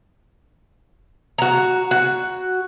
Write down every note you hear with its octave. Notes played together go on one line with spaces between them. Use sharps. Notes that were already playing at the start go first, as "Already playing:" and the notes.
F#4 A#5
F#4